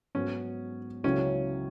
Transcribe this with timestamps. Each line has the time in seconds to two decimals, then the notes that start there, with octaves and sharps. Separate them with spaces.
0.15 G#2 F#3 B3 C#4
1.04 C#2 C#3 F#3 C#4 E4 C#5